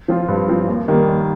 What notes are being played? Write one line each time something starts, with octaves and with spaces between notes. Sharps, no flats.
F3 C4 F4
G2
F3 C4 F4
D#2
D#3 G3 A#3
D#2